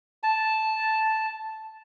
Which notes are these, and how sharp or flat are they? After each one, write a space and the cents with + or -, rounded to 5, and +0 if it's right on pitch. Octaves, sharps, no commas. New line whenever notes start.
A5 -5